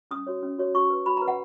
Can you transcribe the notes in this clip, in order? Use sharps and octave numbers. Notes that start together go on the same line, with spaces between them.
C#4 D#6
F#4 C#5
C#4
F#4 C#5
F#4 C#6
B4
F#4 B5
A#5
B4
F#5